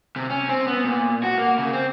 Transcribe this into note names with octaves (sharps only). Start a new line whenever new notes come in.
C3
C#4
C4
B3
A#2
F#4
A#3
C#3
C4